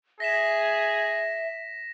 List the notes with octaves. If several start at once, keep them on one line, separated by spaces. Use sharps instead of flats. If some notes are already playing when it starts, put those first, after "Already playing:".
G#4 E5 A#6 B6 E7